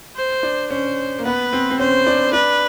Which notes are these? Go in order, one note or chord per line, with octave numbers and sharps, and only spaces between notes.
C5
D4
C#4 C5
A#3
B3 B4
C4
C4
C#4 C5
D4
D4 B4